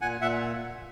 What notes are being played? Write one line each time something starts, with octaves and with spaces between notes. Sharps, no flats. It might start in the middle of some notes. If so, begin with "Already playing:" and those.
A#2 F#5 G#5
A#2 E5 F#5